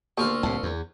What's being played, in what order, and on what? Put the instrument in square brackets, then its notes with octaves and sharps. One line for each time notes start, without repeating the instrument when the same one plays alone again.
[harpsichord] D2 F4 C#6 [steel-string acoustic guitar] A#3 [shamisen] B3 G4 A4
[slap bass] C2 A2 [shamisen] A5
[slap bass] E2